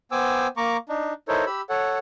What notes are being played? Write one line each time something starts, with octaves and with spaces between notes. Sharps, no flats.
B3 C5 G5 G#5 D6 E6
A#3 A#5 C#6 D6
D4 D#4
D#4 E4 A4 A#4 C5 C#5
G4 B5 E6
A4 C#5 F#5